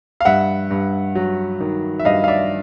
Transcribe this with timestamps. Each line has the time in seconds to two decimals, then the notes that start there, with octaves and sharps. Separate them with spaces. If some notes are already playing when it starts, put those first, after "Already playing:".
0.21 F5
0.25 G2 E5 F#5
0.71 G2
1.15 F#3
1.60 D#3
1.99 E5
2.05 G2 D#5 F5
2.24 F5
2.28 D5 E5